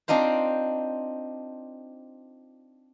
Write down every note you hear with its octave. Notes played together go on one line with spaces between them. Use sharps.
C4 D4 D#4 F4 C5